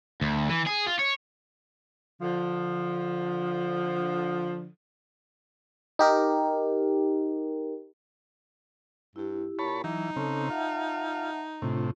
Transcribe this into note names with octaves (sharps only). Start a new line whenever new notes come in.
D2
E3
G#4
F4
C#5
D3 F3
D#4 G4 A#4
G2 E4 G4
A#2 C#5 A5 B5
E3 F#3 D#4
C#3 C4 A4 A5
F4 E5 F#5 A5
A2 C3 D4 F4